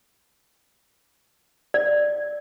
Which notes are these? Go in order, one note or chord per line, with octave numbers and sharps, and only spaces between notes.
D5